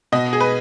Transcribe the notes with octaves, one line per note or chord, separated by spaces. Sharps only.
B2 D#5
G#4
B4